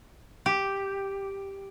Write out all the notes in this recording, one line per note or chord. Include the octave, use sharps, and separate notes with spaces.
G4